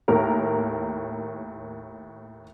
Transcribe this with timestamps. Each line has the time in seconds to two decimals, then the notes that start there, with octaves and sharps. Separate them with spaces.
0.08 D#2 A2 A#4 A#5